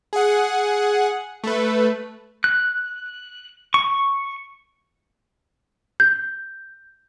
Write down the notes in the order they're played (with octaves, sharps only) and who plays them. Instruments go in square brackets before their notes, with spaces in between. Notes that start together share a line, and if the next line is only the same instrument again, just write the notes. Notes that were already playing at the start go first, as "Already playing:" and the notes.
[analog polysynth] G#4 F#5
A3 B4
[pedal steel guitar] F#6
C#6
[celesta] G6